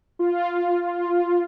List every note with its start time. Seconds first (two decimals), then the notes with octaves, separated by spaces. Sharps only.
0.19 F4